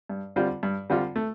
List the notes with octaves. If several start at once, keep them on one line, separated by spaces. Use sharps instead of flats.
G2
D3 G3 C4 F4
G2
D3 G3 C4 F4
A3